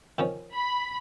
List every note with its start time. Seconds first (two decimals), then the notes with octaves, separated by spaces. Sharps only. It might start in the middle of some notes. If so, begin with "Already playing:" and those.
0.18 D#3 F3 C#4
0.54 B5